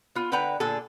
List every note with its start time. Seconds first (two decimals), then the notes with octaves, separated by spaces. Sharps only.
0.15 B3 F4
0.32 D3 B4 F#5 G5 A#5
0.60 A#2 D3 G#4 A4